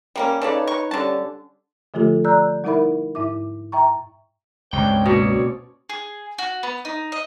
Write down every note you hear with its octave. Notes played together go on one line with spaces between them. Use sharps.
G3 A#3 C#4
C#3 D#4 A4 B4 C#5 D5
C#6
D3 G3 C#4 A5
D3 F3 A3 F4 G4 A4
D5 A#5 E6 F#6 G6
G3 D#4 E4 A#4 E5 B5
G#2 E4 E5 D6
E5 G5 A#5 C#6
C#2 G2 C4 C#5 D5 G5
B2 A#3 C#4
G#4
F#4
B3
D#4
D#5